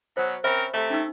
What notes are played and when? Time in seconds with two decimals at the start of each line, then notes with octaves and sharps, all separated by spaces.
0.17 B2 F#3 C5
0.44 C4 C#4 A#4 C5 E5 B5
0.74 C3 A3 E5
0.90 C#4 D#4 E6